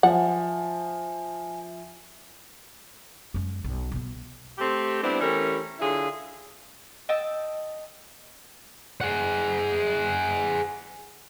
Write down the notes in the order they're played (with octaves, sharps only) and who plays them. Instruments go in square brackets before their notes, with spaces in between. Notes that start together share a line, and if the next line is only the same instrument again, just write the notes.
[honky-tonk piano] F3 [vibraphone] E5 G#5 [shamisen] F#5
[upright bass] F#2 G#3
B1
B2 B3
[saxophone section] A3 C4 G4
G3 B3 C4 D4 E4
E3 A3 C#4 G4 A#4
D3 F#3 E4 F4 G#4
[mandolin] D#5 G5 A5 E6
[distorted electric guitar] G#4 F#5